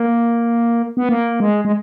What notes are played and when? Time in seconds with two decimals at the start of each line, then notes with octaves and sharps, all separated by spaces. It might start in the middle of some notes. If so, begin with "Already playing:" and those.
Already playing: A#3
0.97 B3
1.09 A#3
1.40 G#3
1.65 G#3